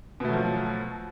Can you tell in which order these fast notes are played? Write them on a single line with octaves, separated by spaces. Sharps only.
B2 A3 F#3 F3